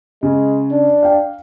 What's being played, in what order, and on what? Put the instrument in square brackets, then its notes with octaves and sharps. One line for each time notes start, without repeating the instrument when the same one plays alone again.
[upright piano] C#3 [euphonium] G#3
[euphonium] D4
[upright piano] F5 G5